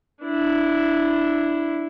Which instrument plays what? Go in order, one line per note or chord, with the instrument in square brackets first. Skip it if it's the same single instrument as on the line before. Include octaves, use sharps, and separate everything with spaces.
[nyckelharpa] D4 E4